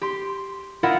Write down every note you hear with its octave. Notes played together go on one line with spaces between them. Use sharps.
G4 C6
E4 F4 A#4 D#5 F5 F#5